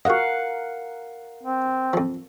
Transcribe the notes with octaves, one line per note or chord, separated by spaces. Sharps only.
F#4 A#4 D#5 F5 F#5
C4
F2 F3